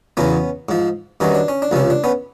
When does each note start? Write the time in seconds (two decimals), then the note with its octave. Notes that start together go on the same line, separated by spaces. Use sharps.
0.17 E2 C#3 F#3 B3 C#4
0.69 G#2 F3
1.20 G2 D#3 F#3 C#4
1.35 D4
1.48 C#4
1.62 D4
1.71 C#2 C3 F3 C#4
1.90 D4
2.04 B3 C#4